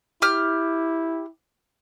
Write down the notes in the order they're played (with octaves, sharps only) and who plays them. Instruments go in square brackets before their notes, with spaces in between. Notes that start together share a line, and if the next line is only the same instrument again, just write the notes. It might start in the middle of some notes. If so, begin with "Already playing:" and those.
[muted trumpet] E4 [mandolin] G4 F6